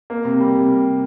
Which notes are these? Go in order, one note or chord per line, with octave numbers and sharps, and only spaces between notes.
A#3
C3
G3
C3